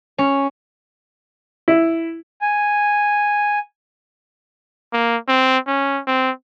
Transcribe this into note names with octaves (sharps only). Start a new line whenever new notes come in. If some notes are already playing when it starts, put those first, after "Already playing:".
C#4
E4
G#5
A#3
C4
C#4
C4